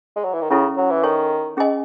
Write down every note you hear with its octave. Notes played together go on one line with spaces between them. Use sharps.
G#3
F#3
E3
D#3
C#3 C#4 E4 A4
F#3
E3
D#3 A4 C#5 G#5 C#6
C#4 G#4 D#5 G#5